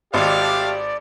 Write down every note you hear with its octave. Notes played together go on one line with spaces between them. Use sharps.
G#1 A3 D4 G4 D5 F5